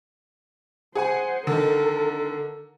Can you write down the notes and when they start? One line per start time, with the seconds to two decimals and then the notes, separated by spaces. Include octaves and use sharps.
0.95 G#4 C5 F#5 G#5
1.47 D3 D#3 A4 A#4